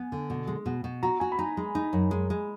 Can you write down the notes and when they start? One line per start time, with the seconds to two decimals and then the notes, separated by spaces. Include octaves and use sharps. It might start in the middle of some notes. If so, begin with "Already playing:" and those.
Already playing: B3 G#5
0.12 D3
0.30 B2
0.47 G#3
0.66 B2
0.84 B2
1.03 F#4 A#5
1.20 F#4 G#5
1.32 B5
1.39 D#4 A#5
1.57 G#3
1.75 D#4
1.93 F#2
2.11 G#3
2.30 G#3